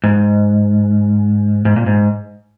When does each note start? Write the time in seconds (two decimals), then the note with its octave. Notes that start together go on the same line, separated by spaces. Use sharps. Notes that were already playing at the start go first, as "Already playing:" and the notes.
0.04 G#2
1.65 G#2
1.76 A#2
1.86 G#2